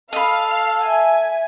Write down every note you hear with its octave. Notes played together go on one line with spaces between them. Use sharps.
A4 D#5 F5 B5
E5 G#5